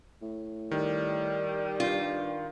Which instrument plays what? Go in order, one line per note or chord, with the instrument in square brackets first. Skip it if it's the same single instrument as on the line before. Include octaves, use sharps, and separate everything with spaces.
[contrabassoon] A2
[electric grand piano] D#3 [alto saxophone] G3
[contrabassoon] G2 [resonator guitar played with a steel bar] F4